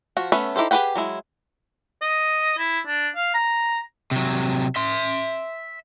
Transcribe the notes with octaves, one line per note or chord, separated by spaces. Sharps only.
F3 F#4
A3 B3 C#4 B4 E5
D#4 E4 G4 A4 C5
G4 G#4 B4 F#5 G5
F#3 G#3 E4
D#5
E4
D4
F5
A#5
C3 F#3
E5 C6